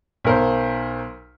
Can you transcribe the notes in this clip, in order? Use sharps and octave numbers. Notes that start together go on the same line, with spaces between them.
B1 A#4 C5